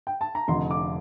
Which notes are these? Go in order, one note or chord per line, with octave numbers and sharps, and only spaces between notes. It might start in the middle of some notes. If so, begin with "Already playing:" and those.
G5
A5
A#5
F1 F2 D3 C6
D6